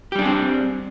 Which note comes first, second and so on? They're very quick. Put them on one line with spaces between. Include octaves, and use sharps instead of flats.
G4 G3 D4 G#4 C4